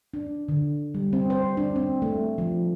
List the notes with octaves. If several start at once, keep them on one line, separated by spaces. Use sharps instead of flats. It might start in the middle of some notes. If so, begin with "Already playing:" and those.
D4
D3
G3
C4
C5
D4
C4
A3
F3